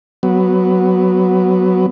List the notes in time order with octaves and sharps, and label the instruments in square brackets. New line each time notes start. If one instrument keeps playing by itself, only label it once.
[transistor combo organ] F#3 B3